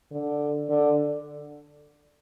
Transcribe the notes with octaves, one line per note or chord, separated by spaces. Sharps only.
D3
D3